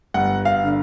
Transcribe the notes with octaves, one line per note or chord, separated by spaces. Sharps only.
G1 F#5
F5
D3